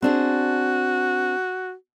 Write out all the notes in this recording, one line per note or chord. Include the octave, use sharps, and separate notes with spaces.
C4 D4 F#4 G#4